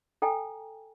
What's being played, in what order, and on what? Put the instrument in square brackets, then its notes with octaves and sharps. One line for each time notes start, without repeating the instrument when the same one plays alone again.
[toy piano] A4 G5 G#5 A#5